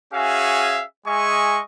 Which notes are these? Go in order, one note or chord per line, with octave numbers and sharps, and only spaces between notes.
C#4 F#4 G#4 E5 F5 G#5
G#3 G#4 D#5 E5 G#5 C#6